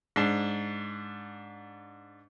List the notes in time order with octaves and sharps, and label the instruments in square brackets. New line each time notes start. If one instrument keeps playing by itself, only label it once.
[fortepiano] G#2 D4